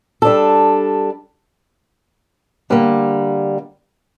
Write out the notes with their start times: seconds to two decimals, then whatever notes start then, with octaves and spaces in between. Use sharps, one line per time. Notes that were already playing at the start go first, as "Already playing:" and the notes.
0.22 G3 D4 A4
2.70 D3 G3 A#3